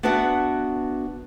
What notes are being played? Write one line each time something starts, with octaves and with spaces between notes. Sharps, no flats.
B3 D4 F#4 B4 E5 F#5